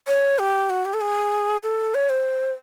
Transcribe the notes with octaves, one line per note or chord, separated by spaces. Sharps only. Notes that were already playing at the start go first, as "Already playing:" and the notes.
C#5
G4
F#4
G4
A4
G#4
A4
C#5
C5